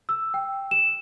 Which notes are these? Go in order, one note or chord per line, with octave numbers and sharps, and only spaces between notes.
E6
G5
E7